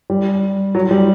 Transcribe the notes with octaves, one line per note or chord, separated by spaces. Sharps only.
G3
F#3
G3